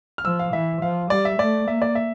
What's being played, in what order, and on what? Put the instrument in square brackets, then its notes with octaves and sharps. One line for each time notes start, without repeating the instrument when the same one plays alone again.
[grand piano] F6
[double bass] F3 [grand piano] E6
[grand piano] F5
[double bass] E3 [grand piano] E5
[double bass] F3 [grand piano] F5
[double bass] G3 [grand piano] D5
[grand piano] E5
[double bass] A3 [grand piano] D5
[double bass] A#3 [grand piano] E5
[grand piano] D5
E5